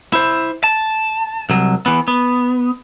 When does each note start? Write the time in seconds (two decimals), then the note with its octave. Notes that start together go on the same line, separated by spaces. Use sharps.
0.13 E4 C5
0.64 A5
1.50 C2 F#3
1.86 E3 B3
2.08 B3